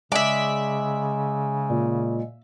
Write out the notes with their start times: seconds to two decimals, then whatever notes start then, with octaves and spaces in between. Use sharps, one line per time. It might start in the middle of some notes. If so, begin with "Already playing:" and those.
0.12 C#3 G#3 D5 E5
1.70 A#2